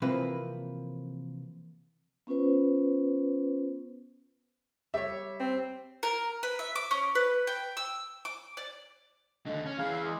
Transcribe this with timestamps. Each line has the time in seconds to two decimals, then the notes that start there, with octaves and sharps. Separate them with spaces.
0.02 C3 E3 F3 A#3 C4 B4
2.27 B3 C#4 F4 B4 C5
4.94 G3 C#5 E5
5.40 C4
6.03 A#4
6.43 B4
6.59 E5
6.76 D6
6.91 C#4
7.15 B4
7.47 G5
7.77 E6
8.25 D6
8.57 D5
9.46 D#2 D3 D#5
9.66 C#4 F6
9.78 E3 G#4 F5 B5
9.91 E6
10.05 G#3 D6